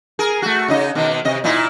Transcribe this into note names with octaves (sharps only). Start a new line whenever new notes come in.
G#4 A#4
A3 F#4
C#3 D#4 D#5
B2 D#3
C3 D#5
A#2 D#4 E4